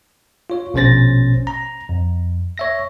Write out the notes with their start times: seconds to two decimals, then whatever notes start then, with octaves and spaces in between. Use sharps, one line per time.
0.50 F4 C#5
0.74 A#1 B2 C#4 C5 A6 A#6
1.47 A#5
1.89 F2
2.58 C#5 E5 A#6